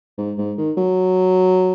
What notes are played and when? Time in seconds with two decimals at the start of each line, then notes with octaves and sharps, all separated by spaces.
0.18 G#2
0.38 G#2
0.58 D#3
0.77 F#3